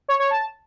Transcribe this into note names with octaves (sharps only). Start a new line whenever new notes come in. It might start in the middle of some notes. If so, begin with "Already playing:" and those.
C#5
C#5
A5